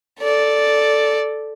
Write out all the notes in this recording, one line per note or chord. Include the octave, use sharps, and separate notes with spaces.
A4 D5